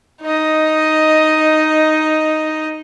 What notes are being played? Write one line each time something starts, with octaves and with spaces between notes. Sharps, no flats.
D#4 D#5